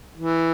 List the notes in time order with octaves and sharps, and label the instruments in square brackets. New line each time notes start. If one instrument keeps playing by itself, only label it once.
[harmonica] E3